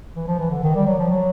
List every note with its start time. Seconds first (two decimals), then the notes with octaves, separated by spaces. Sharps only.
0.15 E3
0.27 F3
0.39 E3
0.51 D3
0.63 D#3
0.75 G3
0.87 F#3
0.99 F3
1.11 F#3